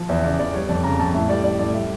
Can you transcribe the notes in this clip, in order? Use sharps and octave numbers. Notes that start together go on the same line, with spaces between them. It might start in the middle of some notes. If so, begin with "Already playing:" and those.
Already playing: F3
E2 E5
C#3 D5
E2 D5
G3 C#5
F2 D5
C#3 A#5
F2 A5
A2 E5
G3 D5
G3 D5
A2 D5
G3 E5